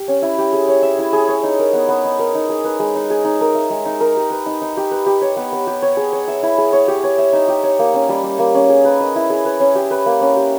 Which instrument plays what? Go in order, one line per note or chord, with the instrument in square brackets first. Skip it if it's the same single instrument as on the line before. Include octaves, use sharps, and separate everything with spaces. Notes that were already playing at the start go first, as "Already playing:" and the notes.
Already playing: [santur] G4
C#4
E4
G4
G#4
C#5
E5
E4
G#4
C#5
D#4
A#4
B3
B3
D#4
A#4
D#4
G#4
B4
G#3
D#4
G#4
D#4
A#4
E5
G#3
D#4
A#4
G4
B4
D#4
D#4
G4
B4
G4
C#5
B3
B3
G4
C#5
G#4
C#5
E5
E4
G#4
C#5
G4
C#5
E5
D#4
G4
C#5
A#3
C#4
G3
G3
A#3
C#4
G#4
B4
D#5
E4
G#4
B4
C#4
G4
B4
A#3
C#4
G4